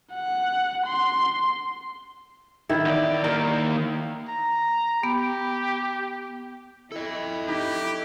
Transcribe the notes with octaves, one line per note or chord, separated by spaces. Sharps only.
F#5
C6
D#3 E4
E2 D5
D#3 A#3 A#4
A#5
B3 G4
E4 A4 D#5
D#4 G4